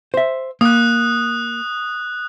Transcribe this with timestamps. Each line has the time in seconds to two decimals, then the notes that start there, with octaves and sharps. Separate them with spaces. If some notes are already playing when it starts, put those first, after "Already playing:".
0.14 C5 E5
0.61 A#3 D#6 F#6